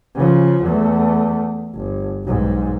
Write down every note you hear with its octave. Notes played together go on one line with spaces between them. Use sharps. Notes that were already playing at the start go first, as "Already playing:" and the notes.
C#3 F3
E2 A3
G1
B1 G#2